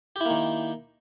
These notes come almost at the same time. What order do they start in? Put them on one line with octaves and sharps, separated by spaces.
G4 E4 A#3 D#3